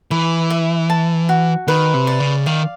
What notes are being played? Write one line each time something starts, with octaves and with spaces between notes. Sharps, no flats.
E3 B4
E5
A5
F#4
D#3 B4
C3
D5
C#3
D#3 F5